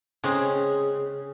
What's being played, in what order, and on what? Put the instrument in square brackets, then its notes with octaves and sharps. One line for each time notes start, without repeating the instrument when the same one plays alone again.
[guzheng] C#3 [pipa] G#3 C4 G#4